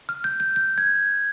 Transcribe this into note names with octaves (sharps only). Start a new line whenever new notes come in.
F6
G6
G6
G6
G#6